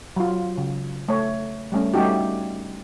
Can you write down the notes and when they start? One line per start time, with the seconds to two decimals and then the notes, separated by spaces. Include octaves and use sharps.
0.16 F#3 F4
0.58 C#3
1.09 A3 C#5
1.72 G3 A3 C#4
1.94 G3 A3 C#4 D#4 F#4 G4